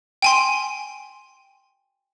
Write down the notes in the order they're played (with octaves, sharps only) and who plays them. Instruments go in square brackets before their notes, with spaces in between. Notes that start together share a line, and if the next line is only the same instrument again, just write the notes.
[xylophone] G5 G#5 C6